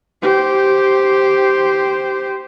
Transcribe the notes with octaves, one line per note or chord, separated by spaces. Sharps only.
G4 C5